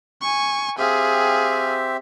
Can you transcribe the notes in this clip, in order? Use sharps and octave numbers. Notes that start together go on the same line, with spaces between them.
G#5 C#6
C4 G4 G#4 E5 F5